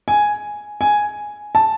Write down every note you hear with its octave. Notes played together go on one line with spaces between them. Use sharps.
G#5
G#5
A5